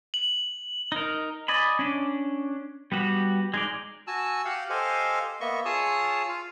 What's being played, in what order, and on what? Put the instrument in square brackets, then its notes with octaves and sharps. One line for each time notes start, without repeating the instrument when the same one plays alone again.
[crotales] F#7
[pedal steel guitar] D#4 A#4
D5 D#5 G#5 B5
C#4 D4
G3 B3 F#4 G4
G#3 D#4 D5
[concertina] F#4 G#5 A5 E6
G4 F5 F#5
G4 A4 C5 D#5 F5 G#5
A#3 B3 D#5 E5 C#6
F4 G#4 C#5 A5 D#6 E6
F4 F5